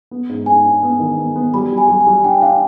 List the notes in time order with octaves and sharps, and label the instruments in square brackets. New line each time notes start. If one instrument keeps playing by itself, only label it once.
[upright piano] B3
G#2
[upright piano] G#2 [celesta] G#5
[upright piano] D4
B3
D#3
B3
B3
[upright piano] G3 [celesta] B5
[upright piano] G3
[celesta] G#5
[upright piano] G3
[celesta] G#5
[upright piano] G3
[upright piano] D4 [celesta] G5
[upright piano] D4 [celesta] F5